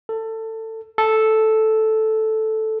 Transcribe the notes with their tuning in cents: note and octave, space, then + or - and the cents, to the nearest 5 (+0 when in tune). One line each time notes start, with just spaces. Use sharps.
A4 +20
A4 -5